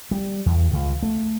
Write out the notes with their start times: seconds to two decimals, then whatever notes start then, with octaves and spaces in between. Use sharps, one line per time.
0.11 G3
0.46 E2
0.73 C#2
1.03 A3